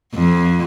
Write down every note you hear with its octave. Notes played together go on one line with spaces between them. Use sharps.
F2